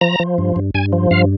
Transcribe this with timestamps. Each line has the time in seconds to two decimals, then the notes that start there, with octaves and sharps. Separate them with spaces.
0.01 F3 A#5
0.20 F3
0.38 G2
0.56 G2
0.75 G2 G#5
0.93 F3
1.11 G2 F5